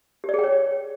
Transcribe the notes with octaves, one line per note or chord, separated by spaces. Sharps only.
G4 G#4 C#5 D5 G5